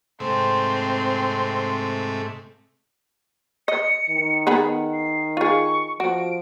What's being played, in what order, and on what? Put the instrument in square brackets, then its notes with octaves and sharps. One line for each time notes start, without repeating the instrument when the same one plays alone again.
[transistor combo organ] G#2 C3 A3 [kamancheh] C4 C6
[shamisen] D#5 [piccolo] C#7
[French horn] D#3
[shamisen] B3 G#4 B5 [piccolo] F#5
[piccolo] C7
[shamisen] F4 G#4 [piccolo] C#6
[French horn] F3 [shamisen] F#4 [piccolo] D7